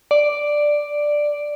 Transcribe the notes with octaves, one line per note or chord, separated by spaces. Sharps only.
D5